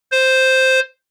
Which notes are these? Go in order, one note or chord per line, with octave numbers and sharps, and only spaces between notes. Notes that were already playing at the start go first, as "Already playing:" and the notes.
C5